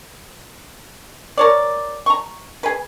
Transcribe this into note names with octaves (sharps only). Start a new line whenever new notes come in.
A#4 C#5 D5
A#5 C#6
G#4 B4